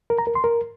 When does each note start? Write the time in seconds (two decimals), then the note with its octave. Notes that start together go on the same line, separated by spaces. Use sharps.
0.10 A#4
0.18 A#5
0.27 A#4
0.35 C6
0.44 A#4